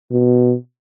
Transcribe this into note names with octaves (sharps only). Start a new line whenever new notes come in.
B2